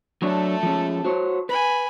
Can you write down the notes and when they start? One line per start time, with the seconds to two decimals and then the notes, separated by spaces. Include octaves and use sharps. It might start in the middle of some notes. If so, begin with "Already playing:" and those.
0.22 F#3 A3 D4 A4 C#5
0.63 F3 G#3 C#4
1.05 F#4 C5 C#5
1.49 B4 G#5 B5